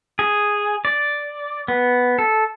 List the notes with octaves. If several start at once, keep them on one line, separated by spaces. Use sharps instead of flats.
G#4
D5
B3
A4